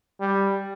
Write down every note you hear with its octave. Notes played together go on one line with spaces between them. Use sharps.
G3